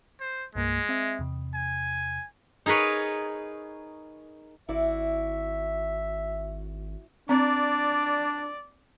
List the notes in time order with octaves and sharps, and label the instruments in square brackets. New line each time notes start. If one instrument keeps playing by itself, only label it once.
[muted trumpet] C5
[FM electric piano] C2 G2 A#3 [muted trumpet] G#3
[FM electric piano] C4 E5
E2 C3
[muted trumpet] G#5
[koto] D#4 G#4 A#4 B4 C#5
[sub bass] G#1 [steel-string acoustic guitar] E4 F#4 D5 [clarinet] E5
[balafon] C4 [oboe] D4 [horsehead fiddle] D5